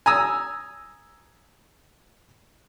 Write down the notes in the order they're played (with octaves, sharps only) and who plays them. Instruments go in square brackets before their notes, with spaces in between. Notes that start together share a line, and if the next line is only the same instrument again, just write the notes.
[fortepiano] G#5 A#5 D#6 E6